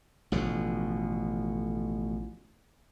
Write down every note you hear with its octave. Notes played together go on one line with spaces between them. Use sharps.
A1 B2 D3 F3